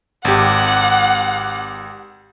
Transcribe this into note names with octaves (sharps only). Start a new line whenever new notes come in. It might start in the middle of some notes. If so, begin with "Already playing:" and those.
G#1 G4 F#5